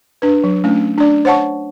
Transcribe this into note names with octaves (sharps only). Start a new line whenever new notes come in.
D4 B4
F#3
A3 C#4 D4
D4 D5
C5 C#5 F#5 A5 C#6